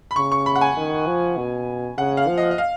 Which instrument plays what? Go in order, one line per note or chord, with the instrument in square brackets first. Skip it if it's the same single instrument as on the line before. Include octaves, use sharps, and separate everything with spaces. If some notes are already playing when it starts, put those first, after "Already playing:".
[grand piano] B5
[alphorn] C#3 [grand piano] C#6
[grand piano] C#6
B5
F#5
G#5
[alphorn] D#3
F3
B2
[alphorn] C#3 [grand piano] F#5
[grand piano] F5
[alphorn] F3
[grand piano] D#5
D#5
F5